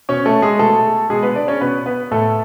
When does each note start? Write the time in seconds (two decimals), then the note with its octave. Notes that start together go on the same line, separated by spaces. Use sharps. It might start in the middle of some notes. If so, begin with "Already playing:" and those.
0.09 B2 C#4 C#5
0.26 A3 A4
0.42 G#3 G#4
0.59 B2 A3 A4
1.10 B2 G#3 G#4
1.23 B3 B4
1.35 D4 D5
1.48 C#4 C#5
1.61 B2 B3 B4
1.86 B3 B4
2.11 A2 A3 A4